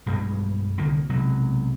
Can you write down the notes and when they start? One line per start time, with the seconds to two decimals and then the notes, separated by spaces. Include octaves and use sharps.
0.06 B1 G2 G3 G#3
0.78 C2 D3 D#3 A#3
1.09 B1 C3 F#3 G#3